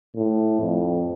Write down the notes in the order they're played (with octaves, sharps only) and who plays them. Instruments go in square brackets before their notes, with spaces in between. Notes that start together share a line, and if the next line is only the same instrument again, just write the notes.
[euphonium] A2
F2